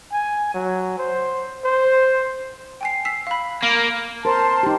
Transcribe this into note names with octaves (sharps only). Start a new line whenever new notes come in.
G#5
F#3
C5
C5
G5 G#5 C7
E6 B6 C7
F5 B5
A#3 F#7
A#4 C5 A5 C6
D#4 G4